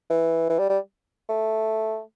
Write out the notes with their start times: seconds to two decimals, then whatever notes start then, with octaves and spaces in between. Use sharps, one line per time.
0.10 E3
0.49 E3
0.59 G3
0.69 G3
1.29 A3